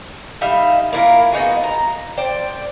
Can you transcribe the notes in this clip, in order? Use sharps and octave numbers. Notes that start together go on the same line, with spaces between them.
G3 D#4 E5 F5
A#3 E4 F4 A#4
B3 D#4 F#4 G#4
A#5
C5 D5 G5